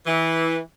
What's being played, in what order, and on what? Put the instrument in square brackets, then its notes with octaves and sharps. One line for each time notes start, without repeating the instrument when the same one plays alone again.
[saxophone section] E3